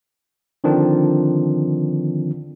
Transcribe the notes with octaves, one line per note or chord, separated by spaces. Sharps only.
D3 D#3 F3 C4 D4